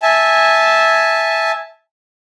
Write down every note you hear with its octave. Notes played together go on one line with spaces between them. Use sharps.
E5 G#5 A5